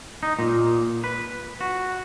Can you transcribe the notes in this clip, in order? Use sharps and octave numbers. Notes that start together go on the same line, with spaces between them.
D#4
A#2
B4
F#4